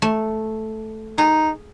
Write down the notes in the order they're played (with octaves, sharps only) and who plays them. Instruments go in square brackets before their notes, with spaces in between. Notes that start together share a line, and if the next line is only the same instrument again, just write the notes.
[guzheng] A3
[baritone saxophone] D#4 [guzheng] G#4